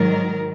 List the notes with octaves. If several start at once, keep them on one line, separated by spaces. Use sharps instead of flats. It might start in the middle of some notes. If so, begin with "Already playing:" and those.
Already playing: G#2 D#3 F#3 A#4